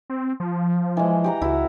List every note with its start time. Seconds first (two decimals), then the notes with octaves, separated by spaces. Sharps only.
0.10 C4
0.40 F3
0.97 E3 G#3
1.24 G4 F#5 A#5
1.42 C#2 E4 F#4